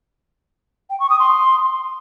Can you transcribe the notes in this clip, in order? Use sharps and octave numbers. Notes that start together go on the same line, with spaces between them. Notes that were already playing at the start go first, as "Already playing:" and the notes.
G5
C#6
D#6
C6